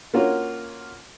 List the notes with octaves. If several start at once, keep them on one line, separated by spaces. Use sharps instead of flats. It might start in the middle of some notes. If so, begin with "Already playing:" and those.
A#3 C#4 F4 F#4 A#4 C#5